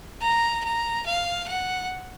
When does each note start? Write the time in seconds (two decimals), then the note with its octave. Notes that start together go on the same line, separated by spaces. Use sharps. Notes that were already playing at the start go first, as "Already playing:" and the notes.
0.22 A#5
0.64 A#5
1.06 F5
1.48 F#5